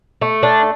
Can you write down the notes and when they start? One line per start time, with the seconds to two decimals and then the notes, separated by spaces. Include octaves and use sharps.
0.21 A3
0.43 D4